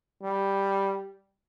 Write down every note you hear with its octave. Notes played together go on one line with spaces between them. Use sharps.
G3